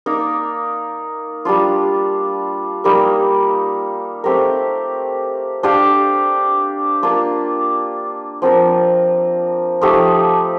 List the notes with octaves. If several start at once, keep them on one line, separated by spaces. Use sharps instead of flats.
A#3 D#4 A#4 D5
G3 D4 F4
G3 A#3 D#4 A#4
A3 C4 G4 A#4
D4 G4 D5 F5
A#3 D4 F4
F3 C4 F4 A#4
F3 A3 D#4 G4